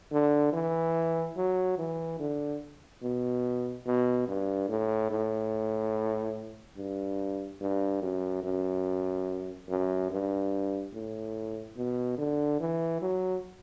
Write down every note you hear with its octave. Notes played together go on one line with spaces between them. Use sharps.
D3
E3
F#3
E3
D3
B2
B2
G2
A2
A2
G2
G2
F#2
F#2
F#2
G2
A2
B2
D3
E3
F#3